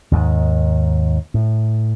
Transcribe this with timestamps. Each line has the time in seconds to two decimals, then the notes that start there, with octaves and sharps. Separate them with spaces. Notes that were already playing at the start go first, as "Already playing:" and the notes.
0.12 D#2 G#2 D#3
1.34 A2